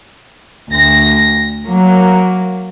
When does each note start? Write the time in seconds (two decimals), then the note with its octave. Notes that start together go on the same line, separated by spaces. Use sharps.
0.69 D2 A#6
1.66 F#3 A#3